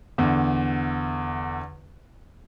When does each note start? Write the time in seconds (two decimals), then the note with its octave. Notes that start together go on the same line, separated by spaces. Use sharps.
0.18 E2 D3